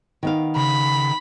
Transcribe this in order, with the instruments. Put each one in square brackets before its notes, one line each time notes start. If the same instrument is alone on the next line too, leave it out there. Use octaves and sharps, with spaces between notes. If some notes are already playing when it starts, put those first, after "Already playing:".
[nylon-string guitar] D#3 B3 F5
[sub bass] C#3 [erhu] B5